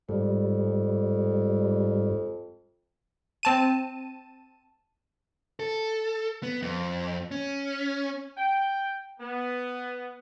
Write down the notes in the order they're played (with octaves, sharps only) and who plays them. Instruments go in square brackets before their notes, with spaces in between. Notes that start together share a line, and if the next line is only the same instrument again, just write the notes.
[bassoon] F2 [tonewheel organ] G#2 G3
[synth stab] C4 A5 D#7
[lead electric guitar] A4
B3
F2
C#4
[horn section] G5
B3